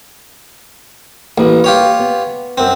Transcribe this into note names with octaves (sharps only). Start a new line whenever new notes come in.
A1 A#3 B4
F4 G4 C#5
B3
F#2 C4